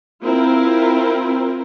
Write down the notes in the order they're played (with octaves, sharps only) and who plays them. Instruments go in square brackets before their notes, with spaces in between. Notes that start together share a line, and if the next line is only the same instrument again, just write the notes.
[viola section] C4 E4 F4 A#4